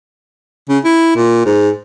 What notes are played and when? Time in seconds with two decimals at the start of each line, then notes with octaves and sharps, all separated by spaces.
0.69 C#3
0.84 E4
1.16 A#2
1.46 G#2